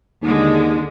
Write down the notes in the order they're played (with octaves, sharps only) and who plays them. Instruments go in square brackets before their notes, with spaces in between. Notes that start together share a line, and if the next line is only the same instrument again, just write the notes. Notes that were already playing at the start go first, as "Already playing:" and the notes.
[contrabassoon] D#2 [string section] D3 G#3